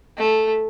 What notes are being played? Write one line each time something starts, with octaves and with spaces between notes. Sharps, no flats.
A3